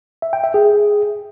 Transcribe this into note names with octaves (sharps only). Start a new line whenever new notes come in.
E5
G5
E5
G#4